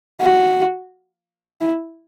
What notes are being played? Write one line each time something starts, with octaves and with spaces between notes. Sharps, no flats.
F#4
E4